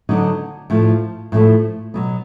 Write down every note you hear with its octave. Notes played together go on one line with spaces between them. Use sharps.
D3 F#3 B3 D#4
A2 F3 A3
A2 F3 A3
B2 F#3 B3